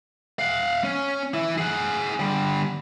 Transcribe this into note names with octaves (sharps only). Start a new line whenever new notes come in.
F5 F#5
C#4
E3 E4
G#4 F#5
D3 G3